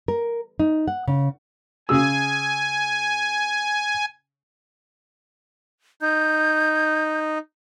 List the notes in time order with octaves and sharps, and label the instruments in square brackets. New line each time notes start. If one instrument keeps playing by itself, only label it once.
[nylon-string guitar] A#4
D#4
F#5
C#3
[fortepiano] C#3 G#4 E6 [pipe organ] G#5
[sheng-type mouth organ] D#4 [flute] G6